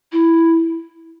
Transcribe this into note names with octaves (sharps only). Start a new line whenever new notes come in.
E4